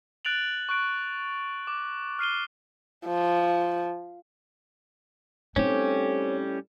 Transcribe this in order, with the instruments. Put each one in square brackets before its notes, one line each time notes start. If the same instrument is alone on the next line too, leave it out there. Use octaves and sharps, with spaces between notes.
[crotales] F#6 A6 D7 F7 F#7
C#6 F#6 D7
D6
F6 C7 D#7 G7
[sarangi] F3
[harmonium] A2 G3 [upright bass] C4 D#4 [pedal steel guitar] C#4 G4 [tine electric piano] C5 C#5